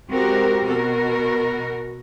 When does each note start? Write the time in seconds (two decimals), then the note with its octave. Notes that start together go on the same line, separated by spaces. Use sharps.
0.12 G#3 C4 F#4 G4 A#4
0.65 B2 F#4 A#4